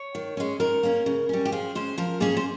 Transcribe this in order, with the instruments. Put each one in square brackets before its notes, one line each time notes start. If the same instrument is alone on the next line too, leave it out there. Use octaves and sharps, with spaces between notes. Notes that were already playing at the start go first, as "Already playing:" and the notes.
Already playing: [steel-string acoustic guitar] C#5
D#3
G#3 C#4
D#3 A#4
A#3 C#4
C#3
G3 C#4
G4
F3 G#4
G#3 C#4 C5
F3 A#4
A#3 C#4 G#4
C5